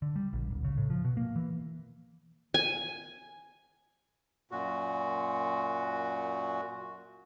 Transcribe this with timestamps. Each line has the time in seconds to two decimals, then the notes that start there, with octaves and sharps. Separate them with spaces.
0.02 D3
0.16 G3
0.33 A#1
0.50 D1
0.64 C#3
0.77 A2
0.90 F3
1.04 B2
1.17 A#3
1.36 E3
2.54 G#5
4.51 F#2 A#2 F#4